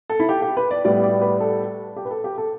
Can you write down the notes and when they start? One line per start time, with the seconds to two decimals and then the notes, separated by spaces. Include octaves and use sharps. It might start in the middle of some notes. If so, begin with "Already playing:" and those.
0.10 A4
0.20 E4
0.29 G4
0.42 G4
0.57 B4
0.71 D5
0.85 A2 G3 B3 D5
1.03 D5
1.21 B4
1.40 A4
1.96 G4
2.05 B4
2.11 A4
2.24 G4
2.38 A4